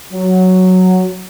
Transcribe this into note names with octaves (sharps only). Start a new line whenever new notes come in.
F#3